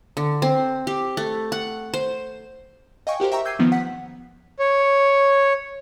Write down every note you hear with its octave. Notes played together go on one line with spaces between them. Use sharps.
D3
C4
G4
A3
F#5
C5
D#5 F5 G5 G#5 C#6
F#4 G4 A#4 C5
E5 G5 A#5 C#6
D6 E6 G6 G#6 C7 D#7
D#3 F3 B3
F#5 B6
C#5